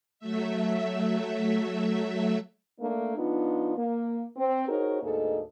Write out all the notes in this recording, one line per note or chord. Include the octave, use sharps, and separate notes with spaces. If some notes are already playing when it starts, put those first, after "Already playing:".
F#3 A3 E5
A3 A#3 D4
F3 B3 D4 D#4 F4
A#3
C4
D#4 F#4 G#4 A#4 C5 C#5
D2 G#2 G#3 A#3 A4 D#5